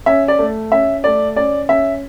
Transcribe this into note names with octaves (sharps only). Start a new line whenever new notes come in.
C#4 E5
D5
A3
C#4 E5
A3 D5
C#4 D5
C#4 E5